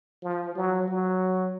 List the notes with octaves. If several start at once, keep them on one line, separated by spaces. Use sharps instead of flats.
F3
F#3
F#3